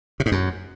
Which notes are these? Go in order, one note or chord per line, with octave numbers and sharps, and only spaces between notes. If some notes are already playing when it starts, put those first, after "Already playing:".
C3
G#2
F#2